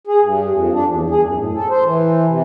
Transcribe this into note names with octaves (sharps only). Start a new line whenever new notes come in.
G#4
G2
F2
D4
E2
G#4
F#2
A2
A4
C5
E3
C3